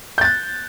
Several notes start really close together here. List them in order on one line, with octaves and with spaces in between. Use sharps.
G6 A6 F#6